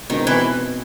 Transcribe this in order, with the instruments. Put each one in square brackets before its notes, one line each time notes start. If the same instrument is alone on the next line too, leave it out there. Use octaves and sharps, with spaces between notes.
[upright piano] B2 G#3 C4 D#4 [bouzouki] D#3
[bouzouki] E3